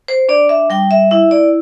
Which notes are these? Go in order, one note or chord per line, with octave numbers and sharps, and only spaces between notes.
C5
D4 D5
E5
G3 G5
E5
E4 E5
D5